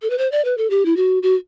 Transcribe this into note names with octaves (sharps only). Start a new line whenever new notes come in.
A4
B4
C5
D5
B4
A4
G4
E4
F#4
F#4